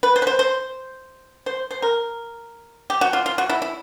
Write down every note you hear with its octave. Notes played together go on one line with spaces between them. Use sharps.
B4
C5
B4
C5
C5
C5
C5
A#4
G4
F#4
F4
F4
F#4
E4
E4